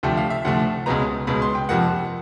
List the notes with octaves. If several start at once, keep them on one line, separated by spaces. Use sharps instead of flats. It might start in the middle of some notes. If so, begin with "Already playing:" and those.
D2 C3 F3 A3 G5
F5
E5
D2 C3 F3 A3 F#5
C#2 B2 G#3 B3 A#5
C#2 B2 G#3 B3 B5
C6
G5
F2 C3 F3 A#3 F#5